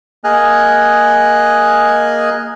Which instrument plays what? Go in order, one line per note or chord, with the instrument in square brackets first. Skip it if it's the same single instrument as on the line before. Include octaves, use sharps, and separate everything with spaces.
[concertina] A#3 G#4 D#5 G#5 F6 F#6